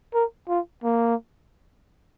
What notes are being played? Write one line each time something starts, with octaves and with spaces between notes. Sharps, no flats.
A#4
F4
A#3